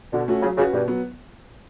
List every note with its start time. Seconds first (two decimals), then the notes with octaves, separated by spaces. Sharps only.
0.13 B2 D3
0.28 A3 C#4 F#4
0.42 C#3 F#3
0.57 C#3 C#4 F#4 B4
0.73 G2 B2
0.88 F#3 B3